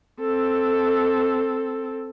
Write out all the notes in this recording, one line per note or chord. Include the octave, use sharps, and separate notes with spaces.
C4 A4